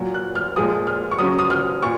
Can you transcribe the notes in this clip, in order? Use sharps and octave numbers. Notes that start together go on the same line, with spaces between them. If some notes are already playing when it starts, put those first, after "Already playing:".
Already playing: A#2 F#3
F#6
F6
A#2 F3 G#3 D#6
F6
C#6
C#3 F#3 D#6
D#6
F6
A#2 C#6